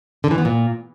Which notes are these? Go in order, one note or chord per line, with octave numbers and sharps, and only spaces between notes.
D3
E3
B3
A#2